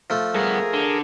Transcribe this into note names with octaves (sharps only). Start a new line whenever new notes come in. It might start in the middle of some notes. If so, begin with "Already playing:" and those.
F3 A3
G2 B3 G#4 A#4
D3